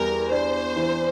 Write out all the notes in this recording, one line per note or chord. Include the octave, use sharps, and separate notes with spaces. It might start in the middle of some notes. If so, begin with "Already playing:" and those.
Already playing: E2 G3 A#4
D4 C5
E3